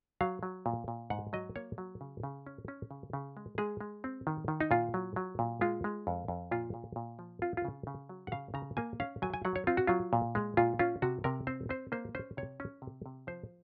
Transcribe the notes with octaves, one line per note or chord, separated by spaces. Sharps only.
F#3 F5
F#3
A#2
A#2
G#2 F#5
F#3 D#5
A#3 C#5
F#3
C#3
C#3
C#4
C#4
C#3
C#3
G#3
G#3 G#4
G#3
C4
D#3
D#3
D#4
A#2 F4
F#3
F#3
A#2
G#3 F4
G#3
F2
F2
A#2 F4
A#2
A#2
F3
C4 F4
F4
C#3
C#3
F#3
F#5
C#3 F5
C#3 A#5
A#3 G#5
C#4 F5
F#3 G#5
G#5
F#3 F#5
C#5
C4 F4
F#4
F#3 F4
A#2
G#3
A#2 F4
C#4 F4
C3 F#4
C3 A#4
C4 C5
C4 C5
A#3 C5
C#4 C5
C3 C#5
C#4
C3
C3
F3 C5